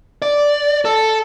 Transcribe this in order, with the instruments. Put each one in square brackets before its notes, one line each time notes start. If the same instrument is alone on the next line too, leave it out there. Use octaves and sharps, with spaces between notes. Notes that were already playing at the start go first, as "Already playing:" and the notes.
[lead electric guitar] D5
A4